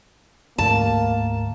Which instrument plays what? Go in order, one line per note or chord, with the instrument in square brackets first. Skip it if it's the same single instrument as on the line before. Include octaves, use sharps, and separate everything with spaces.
[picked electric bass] D2 G#2 A3 [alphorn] A#3 [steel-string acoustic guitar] A5